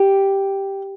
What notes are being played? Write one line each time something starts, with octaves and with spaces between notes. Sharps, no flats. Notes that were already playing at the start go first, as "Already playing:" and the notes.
Already playing: G4